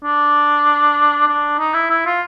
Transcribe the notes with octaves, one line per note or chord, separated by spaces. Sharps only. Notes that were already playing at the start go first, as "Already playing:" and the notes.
D4
D4
D#4
E4
E4
F4